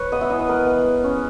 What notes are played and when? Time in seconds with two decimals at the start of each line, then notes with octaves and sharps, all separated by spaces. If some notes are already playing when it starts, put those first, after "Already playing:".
Already playing: B4 C#5
0.12 B3 D#5
0.21 E5
0.30 E3 D#5
0.39 B4
0.49 B3 A#4
0.67 B3
0.85 G#3
1.03 C#4